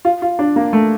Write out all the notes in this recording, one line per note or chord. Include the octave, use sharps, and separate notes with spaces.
F4
F4
D4
A#3
A3